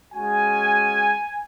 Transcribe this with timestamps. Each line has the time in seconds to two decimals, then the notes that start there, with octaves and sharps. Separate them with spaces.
0.14 G#3 C#4 F#4 G#5